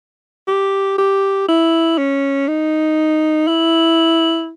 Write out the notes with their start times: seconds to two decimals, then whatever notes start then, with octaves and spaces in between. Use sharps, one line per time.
0.47 G4
0.98 G4
1.48 E4
1.98 C#4
2.48 D#4
3.47 E4